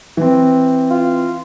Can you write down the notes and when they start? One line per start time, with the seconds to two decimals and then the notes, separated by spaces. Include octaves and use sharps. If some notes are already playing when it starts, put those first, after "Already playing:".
0.17 E3 C4
0.90 F4